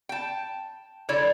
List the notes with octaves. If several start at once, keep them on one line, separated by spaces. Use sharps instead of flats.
G5 A5
D3 E4 C#5 D5